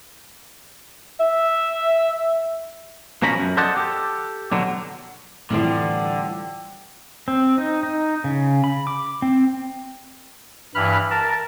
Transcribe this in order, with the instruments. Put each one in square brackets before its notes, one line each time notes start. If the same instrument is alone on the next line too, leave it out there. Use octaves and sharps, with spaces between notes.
[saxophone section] E5
[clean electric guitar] B2 F3 C#4 A#5 B5
F#2
A4 C5 D5 D#5 F#5 A5
G4 A4
B2 D3 F#3
[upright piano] A2 E3 [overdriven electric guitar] D3 [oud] F3 G3 C4
[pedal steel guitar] C4
D#4
D#4
C#3
B5
D6
C4
[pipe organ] G2 E3 B5 F6 F#6
A#4 A5